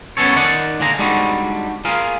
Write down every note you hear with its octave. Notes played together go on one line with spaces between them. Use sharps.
F#2 B3 C#4 A4 C#5
D#3 D#4 D5 F#5
A#2 D3 G#3 A#5
G3 G#3 D4 D#4 F#4
F4 G#4 A#4